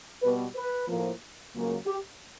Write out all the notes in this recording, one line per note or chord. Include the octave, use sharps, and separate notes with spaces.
B2 G3 B3 B4
B4
A2 F3 A#3
C#2 C#3 F#3 A#3
G4